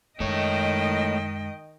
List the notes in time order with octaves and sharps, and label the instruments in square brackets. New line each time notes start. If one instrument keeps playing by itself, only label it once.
[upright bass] F#2 G#3 [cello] D#3 G5 [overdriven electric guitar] A3 C#5 [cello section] D#5